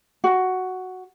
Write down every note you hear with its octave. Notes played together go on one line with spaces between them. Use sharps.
F#4